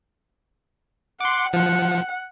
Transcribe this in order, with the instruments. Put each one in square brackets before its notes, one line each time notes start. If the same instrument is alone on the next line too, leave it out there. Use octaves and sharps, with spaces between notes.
[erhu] F#5 [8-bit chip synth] C6 D6
[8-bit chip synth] F3 [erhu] F#5